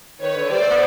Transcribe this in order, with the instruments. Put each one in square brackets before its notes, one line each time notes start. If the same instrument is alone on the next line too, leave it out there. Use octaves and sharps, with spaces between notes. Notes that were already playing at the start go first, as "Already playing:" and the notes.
[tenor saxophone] D#3 [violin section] B4 C#5
[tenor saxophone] D3
[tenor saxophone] G3 [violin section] C5 D5
[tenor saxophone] A3
B3